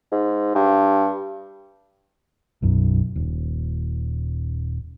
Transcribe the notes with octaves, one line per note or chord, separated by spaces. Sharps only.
G#2
G2
B1 F#2
D#1